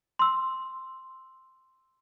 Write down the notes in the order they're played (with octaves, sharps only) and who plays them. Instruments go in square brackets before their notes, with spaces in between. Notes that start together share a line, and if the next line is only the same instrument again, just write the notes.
[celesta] C6 E6